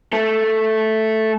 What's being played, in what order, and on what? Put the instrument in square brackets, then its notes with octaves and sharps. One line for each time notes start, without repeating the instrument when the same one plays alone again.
[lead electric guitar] A3 A4